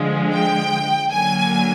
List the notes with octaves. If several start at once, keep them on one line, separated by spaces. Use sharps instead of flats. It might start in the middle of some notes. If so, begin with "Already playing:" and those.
Already playing: D3 F3 G#3
G5
D3 F#3 A#3 G#5